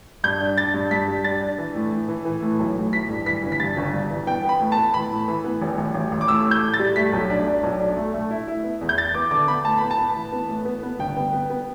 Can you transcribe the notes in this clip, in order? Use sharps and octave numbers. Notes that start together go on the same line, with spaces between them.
G2 G6
D4
D4 A6
G2
G2 B6
G3
D4 A6
D4
E3
A2
A2
E3
E3
A2
B1
A2
E3 B6
G2
E3 B6
G1
B6
G2 A6
G1
G2
E3
B3 G5
B3 B5
A2
A5
B3
E3 B5
A2
E3
B3
A1
A1
A1
A1
D6
A2 E6
A2
G6
A2
A6
G3
A3 B6
B1
D4
D4
B1
D4
A3
A3
E4
E4
B3
E2
G6
E4 A6
B3 D6
D3 D6
B3 B5
A2 A5
B3 B5
A5
B3
E3
B3
A2
B3
B3
G1 G5
B3
B3
B3